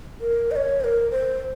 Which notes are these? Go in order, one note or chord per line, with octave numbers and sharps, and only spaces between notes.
A#4
D#5
C#5
C5
A#4
C5